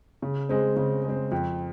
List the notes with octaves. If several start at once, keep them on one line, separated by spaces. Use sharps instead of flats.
C#3
G#3 C4
C#3
G#3 C4
F2